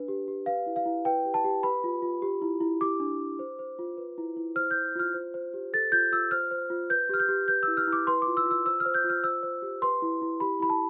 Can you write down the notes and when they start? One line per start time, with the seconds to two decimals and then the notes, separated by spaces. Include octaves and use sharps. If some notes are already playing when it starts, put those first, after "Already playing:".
Already playing: D4 B4
0.08 G4
0.28 G4
0.46 B4 F5
0.66 E4
0.76 F5
0.85 E4
1.05 B4 G5
1.25 G4
1.34 A5
1.44 G4
1.63 B4 B5
1.84 F4
2.02 F4
2.22 G4
2.42 E4
2.61 E4
2.81 G4 D6
3.00 D4
3.20 D4
3.39 C5
3.59 C5
3.79 F4
3.97 B4
4.18 E4
4.37 E4
4.56 C5 F6
4.71 C5 G6
4.96 F4 F6
5.14 C5
5.34 C5
5.54 G4
5.73 A4 A6
5.92 F4 G6
6.12 F4 E6
6.31 C5 F6
6.51 C5
6.70 F4
6.90 B4 G6
7.09 G4 F6
7.20 G6
7.29 G4
7.48 B4 G6
7.63 E4 E6
7.77 F6
7.87 E4
7.93 D6
8.07 B4 C6
8.22 D6
8.27 F4
8.37 E6
8.45 F4
8.51 E6
8.65 C5 E6
8.80 F6
8.86 C5
8.94 G6
9.04 F4
9.09 F6
9.24 C5 E6
9.43 C5
9.62 G4
9.82 B4 C6
10.02 E4
10.22 E4
10.40 G4 B5
10.60 E4 B5
10.70 A5